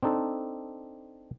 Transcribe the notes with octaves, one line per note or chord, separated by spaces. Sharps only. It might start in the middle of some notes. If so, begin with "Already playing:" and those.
C4 D4 D#4 A4